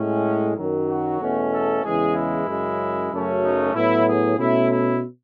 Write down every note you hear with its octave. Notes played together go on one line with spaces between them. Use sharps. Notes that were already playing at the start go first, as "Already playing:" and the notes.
Already playing: A2 G#3 C#4
F#2 D#3 F#3
F#4
E2 B2 A3 C#4
A4
E2 C#3 E3 G#3 G#4
E4
F#2 C#3 G#3
F#2 C#3 F#3 A3 C#4
D#4
A2 F#3 B3 E4
G#4
B2 A3 C#4 E4
E4